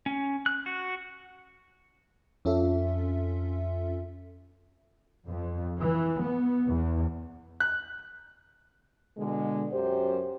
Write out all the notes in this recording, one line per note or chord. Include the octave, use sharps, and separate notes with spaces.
C#4
F#6
F#4
F2 C#4 F4 A4 E5
F2
E3
B3
E2
F#6
B2 D3 G#3
F#2 G4 C5